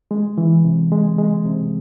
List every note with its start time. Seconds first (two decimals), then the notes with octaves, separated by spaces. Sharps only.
0.11 G#3
0.38 E3
0.64 C3
0.92 G#3
1.19 G#3
1.46 C3